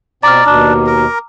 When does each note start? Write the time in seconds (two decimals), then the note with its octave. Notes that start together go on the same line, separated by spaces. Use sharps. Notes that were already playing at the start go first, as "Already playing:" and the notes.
0.23 B2 C4 D5 A#5 D6 F6
0.46 D#2 B2 D4
0.87 A#4